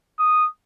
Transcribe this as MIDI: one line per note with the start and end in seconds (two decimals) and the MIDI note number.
0.19 0.47 87